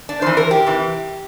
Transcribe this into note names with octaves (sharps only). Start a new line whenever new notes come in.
D4
F2 E3 C5
A#4
G4
C3 E3